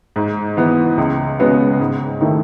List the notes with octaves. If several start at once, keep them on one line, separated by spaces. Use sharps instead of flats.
G#2
E3 B3
C#2
C#3 G#3 B3 F#4
G#2
D#3 A3 E4